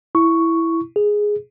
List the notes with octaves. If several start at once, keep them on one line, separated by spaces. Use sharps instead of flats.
E4 C#6
G#4